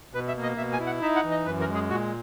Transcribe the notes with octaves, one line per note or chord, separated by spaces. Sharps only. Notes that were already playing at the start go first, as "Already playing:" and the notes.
B2 B4
E5
A#3
D#5
B2 E5
G#5
E4
F#5
D#4 E5
F#5
E3
D#5
F#2 B4
A#4
G#3
G#4
A#2 F#4